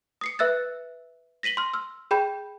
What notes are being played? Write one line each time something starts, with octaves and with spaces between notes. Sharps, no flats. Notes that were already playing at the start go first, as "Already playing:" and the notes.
D#6 C7 C#7
B4 E5 E6 F#6 A6
A#6 B6 D#7 F#7 G7
C6 F6
E6 F6
G#4 G5 B5 G6